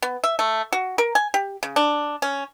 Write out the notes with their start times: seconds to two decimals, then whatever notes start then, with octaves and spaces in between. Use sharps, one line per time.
0.02 B3
0.24 E5
0.39 A3
0.72 F#4
0.98 A#4
1.15 G#5
1.34 G4
1.63 C#3
1.76 D4
2.22 C#4